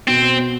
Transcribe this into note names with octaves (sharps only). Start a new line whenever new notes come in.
B2 C4